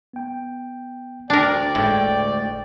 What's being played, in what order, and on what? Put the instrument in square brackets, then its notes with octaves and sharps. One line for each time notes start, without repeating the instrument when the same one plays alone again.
[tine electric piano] B3 G5
[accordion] D2 D5 [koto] D4 A#4 [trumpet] G5
[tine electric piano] G1 G#3 [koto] A2